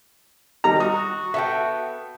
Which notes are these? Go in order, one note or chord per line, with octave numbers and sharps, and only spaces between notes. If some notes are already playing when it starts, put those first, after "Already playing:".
D#3 G3 A#5
F#4 D#6
B3 A4 E5 G5